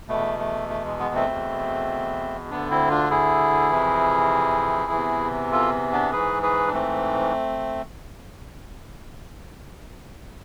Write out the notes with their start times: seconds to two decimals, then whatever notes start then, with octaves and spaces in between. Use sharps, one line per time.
0.08 E2 B2 A3
0.39 A3
0.69 A3
0.85 G#3
0.99 G#3 B3
1.15 A3 C4
1.30 E2 B2
2.50 D2 D3 B3 D4
2.70 C4 E4
2.90 D4 F4
3.11 E4 G#4
3.71 F2 C3 E3
4.92 E2 C3 E3
5.52 F4 A4
5.92 B3 D4
6.12 G#2 E3 G#4 B4
6.43 G#4 B4
6.67 D4
6.73 A3 C4